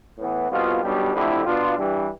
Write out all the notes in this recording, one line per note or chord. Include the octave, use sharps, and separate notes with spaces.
A2 E3 B3
C2 B2 B3 F4
B1 B2 G3 D4 G4
F2 D3 A3 E4 G4
B2 B3 D4 F4
G2 E3 G3 D4 G4